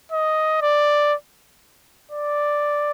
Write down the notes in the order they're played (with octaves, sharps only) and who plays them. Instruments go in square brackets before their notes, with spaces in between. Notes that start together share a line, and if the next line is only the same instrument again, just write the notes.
[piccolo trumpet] D#5
D5
D5